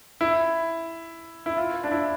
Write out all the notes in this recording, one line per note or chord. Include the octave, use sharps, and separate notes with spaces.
E4
E4
F4
D4
E4